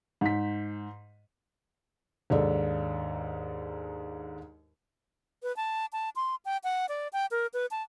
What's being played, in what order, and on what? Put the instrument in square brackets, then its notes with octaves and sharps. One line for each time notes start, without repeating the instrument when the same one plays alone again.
[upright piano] G#2 B6
[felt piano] D#2 G#2 D4 A4
[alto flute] B4
A5
A5
C6
G5
F#5
D5
G5
A#4
B4
A5